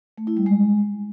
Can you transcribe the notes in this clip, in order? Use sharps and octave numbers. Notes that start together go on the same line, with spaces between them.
A3
E4
G3
G#3